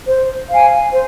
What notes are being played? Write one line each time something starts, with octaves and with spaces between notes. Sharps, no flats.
C5
F5 G#5
C5